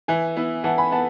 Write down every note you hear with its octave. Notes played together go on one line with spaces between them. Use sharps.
E3 E5 G#5
B3 E4
E3 F#5 A5
G#5 B5
B3 F#5 A5